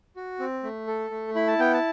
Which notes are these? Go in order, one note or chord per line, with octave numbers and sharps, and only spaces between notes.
F#4
C4
A3
A4
A3
E4 B5
A5
B3 G5
A5